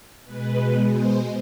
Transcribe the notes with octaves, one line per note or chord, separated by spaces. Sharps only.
B2 G#3 B4
C5